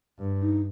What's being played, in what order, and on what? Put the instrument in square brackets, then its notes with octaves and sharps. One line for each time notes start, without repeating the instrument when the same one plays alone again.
[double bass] G2
[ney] D#4